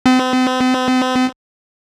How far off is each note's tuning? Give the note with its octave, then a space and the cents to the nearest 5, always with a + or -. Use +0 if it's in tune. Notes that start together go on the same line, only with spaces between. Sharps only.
C4 -40